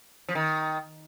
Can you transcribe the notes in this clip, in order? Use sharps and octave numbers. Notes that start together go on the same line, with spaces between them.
F3
D#3